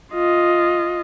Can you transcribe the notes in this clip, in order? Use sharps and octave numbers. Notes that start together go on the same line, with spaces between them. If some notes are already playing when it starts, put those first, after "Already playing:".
F4 D#5